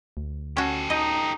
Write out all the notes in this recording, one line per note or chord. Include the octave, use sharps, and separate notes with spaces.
D2
C#4 F#4 G4 A4
D#4 D#5